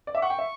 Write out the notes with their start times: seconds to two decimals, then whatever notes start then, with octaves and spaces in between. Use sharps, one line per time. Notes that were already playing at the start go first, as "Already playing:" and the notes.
0.07 D5
0.15 E5 D6
0.22 F#5 C#6
0.30 G5
0.39 E5